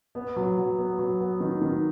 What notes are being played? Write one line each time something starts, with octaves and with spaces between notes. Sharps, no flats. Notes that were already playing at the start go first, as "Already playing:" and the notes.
B3
F#3
F#3
B3
F#3
B3
D#3
D#3